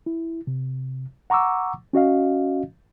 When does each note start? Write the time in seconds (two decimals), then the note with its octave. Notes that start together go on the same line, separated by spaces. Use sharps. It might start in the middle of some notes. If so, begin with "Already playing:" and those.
0.06 E4
0.47 C3
1.30 F#5 A#5 C#6 D6 E6
1.93 C#4 F#4 D#5 F5